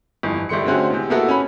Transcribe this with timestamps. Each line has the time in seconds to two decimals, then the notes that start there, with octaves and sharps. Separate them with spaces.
0.23 G1 F2 E3
0.49 G1 G3 A3 C6 C#7
0.65 D3 G#3 A3 C4 C#4 F#4
0.90 E2 C3
1.10 A#3 B3 E4 F#4 A4
1.28 C#4 B5